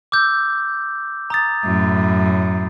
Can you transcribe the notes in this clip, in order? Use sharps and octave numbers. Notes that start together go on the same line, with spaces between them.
D6 E6 G6
A#5 D#6 A6
F#2 A2